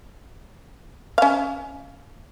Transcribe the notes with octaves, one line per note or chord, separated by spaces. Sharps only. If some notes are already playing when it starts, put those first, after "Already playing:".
C#4 F5